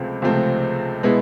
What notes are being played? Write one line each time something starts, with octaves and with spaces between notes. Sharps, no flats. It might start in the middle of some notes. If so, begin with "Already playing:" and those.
Already playing: C#2 C3 F3 A3 C4
C#2 C3 F3 A3 C4
B2 G#3 B3 E4